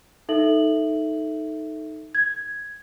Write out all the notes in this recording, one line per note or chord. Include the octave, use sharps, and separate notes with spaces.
D#4 A4 E5 F#7
G#6